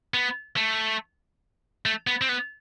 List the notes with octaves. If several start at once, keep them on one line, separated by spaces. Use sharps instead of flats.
B3
A3
A3
B3
C4
B3